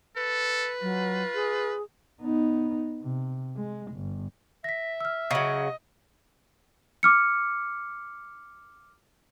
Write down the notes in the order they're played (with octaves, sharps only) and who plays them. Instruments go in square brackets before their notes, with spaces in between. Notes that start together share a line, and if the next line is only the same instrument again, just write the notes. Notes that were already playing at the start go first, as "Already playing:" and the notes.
[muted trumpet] A4 [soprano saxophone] B4
[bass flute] F#3 [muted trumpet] F4
[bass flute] G#4
[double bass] B3 D#4
C3
G#3
G1
[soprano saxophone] E5 [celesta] A#6 B6
[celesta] E6 F6
[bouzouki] C#3 F#3 [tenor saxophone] D#5
[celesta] D6 F6 C#7